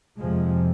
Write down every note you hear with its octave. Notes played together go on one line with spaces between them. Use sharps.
F2 C3 F3 G#3